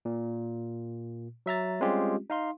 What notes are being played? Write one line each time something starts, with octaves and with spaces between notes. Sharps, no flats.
A#2
F#3 E5 A#5 A6
G3 G#3 C4 C#4 F4 G4
D#4 F5 C6